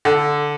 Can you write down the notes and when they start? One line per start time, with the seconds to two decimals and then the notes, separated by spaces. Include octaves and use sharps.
0.05 D3